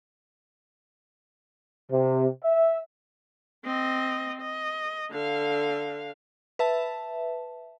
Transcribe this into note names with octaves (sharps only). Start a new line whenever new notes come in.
C3
E5
C4 D#5
D#5
D3 F5
B4 E5 A5